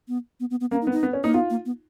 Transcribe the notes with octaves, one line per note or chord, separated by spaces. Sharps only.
B3
B3
B3
B3
A#3 C#4
D#4
B3
D#4
B3
C#4
A#3 D#4
B3 F4
A#3
B3